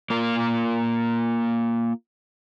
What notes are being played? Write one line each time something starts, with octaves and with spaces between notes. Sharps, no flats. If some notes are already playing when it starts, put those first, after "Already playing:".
A#3 F4 A#4